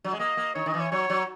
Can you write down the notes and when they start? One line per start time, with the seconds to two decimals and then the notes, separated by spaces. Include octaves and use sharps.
0.04 F#3
0.13 G#3
0.20 A#3 D#5
0.37 A#3
0.55 D#3 C#5
0.66 D#3 D#5
0.74 E3
0.80 C#5
0.91 F#3 C#5
1.10 F#3